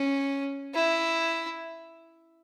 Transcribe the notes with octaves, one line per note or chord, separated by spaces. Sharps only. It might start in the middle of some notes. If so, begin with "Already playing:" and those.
Already playing: C#4
E4